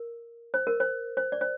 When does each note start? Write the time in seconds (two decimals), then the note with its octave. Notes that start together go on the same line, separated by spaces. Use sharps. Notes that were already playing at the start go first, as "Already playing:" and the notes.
Already playing: A#4
0.54 C5
0.67 A#4
0.80 C5
1.17 C5
1.32 D5
1.41 C5